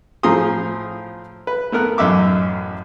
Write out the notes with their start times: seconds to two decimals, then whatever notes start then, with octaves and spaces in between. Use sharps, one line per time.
0.23 A2 F3 G#4 A#5 C6 D#6
1.47 B4
1.72 A3 B3 A#4 F#6
1.98 A1 F#2 D#4 E5 D6